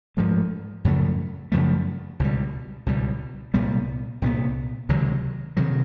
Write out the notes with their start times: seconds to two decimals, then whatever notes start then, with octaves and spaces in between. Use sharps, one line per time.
0.17 G#2 F3 A3
0.84 F#2 C#3 F3 A3
1.52 F#2 C#3 F3 A3
2.20 C#2 B2 G3
2.86 C#2 B2 G3
3.54 C2 A#2 G3 B3
4.22 C2 A#2 G3 B3
4.89 C#2 C3 D#3 F#3
5.57 C3 D#3 F#3